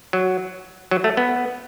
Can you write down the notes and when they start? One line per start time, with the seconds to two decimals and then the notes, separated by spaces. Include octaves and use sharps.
0.13 F#3
0.91 F#3
1.04 A3
1.17 B3